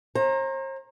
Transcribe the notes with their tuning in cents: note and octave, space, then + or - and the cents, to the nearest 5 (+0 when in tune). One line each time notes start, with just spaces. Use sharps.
C5 +45 A#5 +0